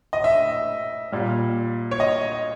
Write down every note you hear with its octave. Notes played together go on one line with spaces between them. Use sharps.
D#5
E5
A#2 G3
C#5
D#5